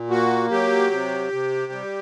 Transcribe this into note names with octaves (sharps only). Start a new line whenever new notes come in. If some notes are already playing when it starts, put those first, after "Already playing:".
Already playing: A#2
A#3 F#4
F#3 G4
C3
C3
G3